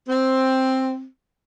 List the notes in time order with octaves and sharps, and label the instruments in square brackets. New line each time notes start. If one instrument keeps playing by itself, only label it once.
[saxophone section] C4